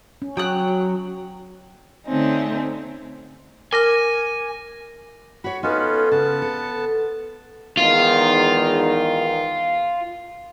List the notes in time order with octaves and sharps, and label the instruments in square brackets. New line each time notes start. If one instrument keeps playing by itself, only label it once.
[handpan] C#4
[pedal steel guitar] F#3 [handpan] F#4 [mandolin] G5 D#6 F#6
[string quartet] D3 A3 C4 C#4 D#4
[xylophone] A#4 F6 [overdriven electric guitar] G#5 [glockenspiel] D6 A#6
[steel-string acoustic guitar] F#4 C#5 [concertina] B5
[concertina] B3 C#4 F4 [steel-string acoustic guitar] D#4 A4 B4
[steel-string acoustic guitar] C#3 [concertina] B3 A5
[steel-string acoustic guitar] A4
[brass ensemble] E2 G#2 D#3 [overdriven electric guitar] F4